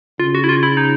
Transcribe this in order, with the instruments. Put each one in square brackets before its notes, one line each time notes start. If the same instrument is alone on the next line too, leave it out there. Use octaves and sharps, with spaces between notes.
[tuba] C#3 [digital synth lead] F4
[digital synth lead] F#4
E4
F4
E4
D#4